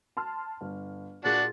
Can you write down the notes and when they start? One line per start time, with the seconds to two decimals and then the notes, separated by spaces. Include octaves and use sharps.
0.17 A5 C6 F6
0.61 G1
1.25 A#2 D4 F4 F#4 G#4 F#5 A6